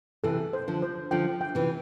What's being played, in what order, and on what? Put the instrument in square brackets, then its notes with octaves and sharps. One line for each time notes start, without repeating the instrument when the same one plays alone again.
[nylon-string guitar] C3 E3 [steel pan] A4
[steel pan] C5
[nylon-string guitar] D3 F3
[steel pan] C5
[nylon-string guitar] D3 F3 [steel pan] G5
[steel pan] G5
[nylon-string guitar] C3 E3